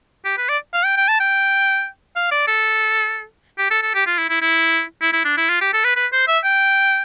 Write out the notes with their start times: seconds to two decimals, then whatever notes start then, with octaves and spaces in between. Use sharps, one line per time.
0.25 G4
0.37 B4
0.49 D5
0.73 F5
0.85 G5
0.97 G5
1.08 A5
1.20 G5
2.16 F5
2.31 D5
2.47 A4
3.58 G4
3.70 A4
3.82 A4
3.95 G4
4.06 F4
4.18 E4
4.29 E4
4.41 E4
5.01 E4
5.13 E4
5.25 D4
5.37 E4
5.49 F4
5.61 G4
5.73 A4
5.84 B4
5.96 B4
6.12 C5
6.28 E5
6.44 G5